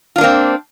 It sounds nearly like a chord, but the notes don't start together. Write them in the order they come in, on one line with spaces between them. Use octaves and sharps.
F4 D4 A#3 C4